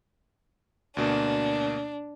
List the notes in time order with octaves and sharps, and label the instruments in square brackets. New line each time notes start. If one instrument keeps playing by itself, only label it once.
[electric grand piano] D2 B2 A#3 [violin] D4